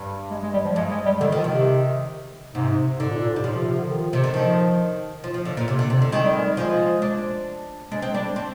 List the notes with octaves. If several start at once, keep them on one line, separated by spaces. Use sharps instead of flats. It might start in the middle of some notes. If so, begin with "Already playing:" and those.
Already playing: G2
G#3
G#3
G3
F3
G2 G#3
G#3
G3
D3 D#3
D#3 F3
D#3
C3
G#2 C3
G#2 D3
A#2
A#2
G#2
G3
A#2 F3
C3
C3
D3
D#3
C3
D3
D#3 F3
F3
F3
D3
A#2
C3
D3
C3
D3
D#3 G#3
G3
G#3
G3
F3 G#3
D4
G#3 D4
C4
G3 D4
C4